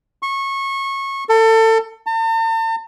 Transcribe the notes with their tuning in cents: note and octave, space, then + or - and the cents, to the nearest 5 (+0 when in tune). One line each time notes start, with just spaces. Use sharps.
C#6 -25
A4 +30
A5 +45